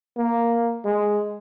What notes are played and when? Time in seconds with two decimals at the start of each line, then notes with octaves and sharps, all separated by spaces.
0.17 A#3
0.85 G#3